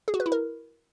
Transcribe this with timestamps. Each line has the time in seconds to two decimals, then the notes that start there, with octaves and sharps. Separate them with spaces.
0.08 G#4
0.14 F#4
0.20 B4
0.26 E4
0.32 A#4